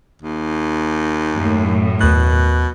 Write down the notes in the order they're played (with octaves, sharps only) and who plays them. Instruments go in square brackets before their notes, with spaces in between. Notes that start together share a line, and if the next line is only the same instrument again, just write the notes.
[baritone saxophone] D#2
[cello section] F#2 A2
[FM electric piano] D#2 F#6 [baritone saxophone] B2